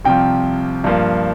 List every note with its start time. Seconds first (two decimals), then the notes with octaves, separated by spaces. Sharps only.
0.05 C2 C3 F3 G5
0.84 G2 F3 A#3